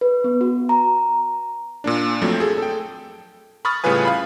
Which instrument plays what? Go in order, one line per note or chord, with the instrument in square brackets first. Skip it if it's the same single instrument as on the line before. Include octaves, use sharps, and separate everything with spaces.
[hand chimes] B4
B3
F#4
A#5
[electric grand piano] A#2 A#3 D4
F2 F3 F#3 A3 C4
G#4 A4
A4 G5
B5 C#6 D#6 F6 A6
A2 C#3 G3 F4 B4 G#5
F5 B5